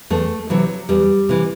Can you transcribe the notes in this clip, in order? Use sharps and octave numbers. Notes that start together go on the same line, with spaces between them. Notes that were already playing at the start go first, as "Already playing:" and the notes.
E2 A3
C3 E3 F#3
E2 G3
C3 E3